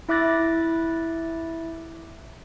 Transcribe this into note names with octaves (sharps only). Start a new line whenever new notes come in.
E4 E5 D6 F#6 A6 A#6